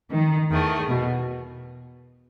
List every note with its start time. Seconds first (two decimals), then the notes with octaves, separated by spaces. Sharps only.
0.12 D#3
0.51 E2 D#3 A3
0.90 B2